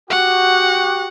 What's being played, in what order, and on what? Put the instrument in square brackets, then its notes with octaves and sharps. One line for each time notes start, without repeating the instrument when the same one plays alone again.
[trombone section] F#4 G4 [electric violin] F#5